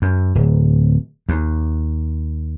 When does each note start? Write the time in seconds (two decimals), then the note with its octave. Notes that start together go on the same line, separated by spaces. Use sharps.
0.02 F#2
0.35 D1
1.29 D#2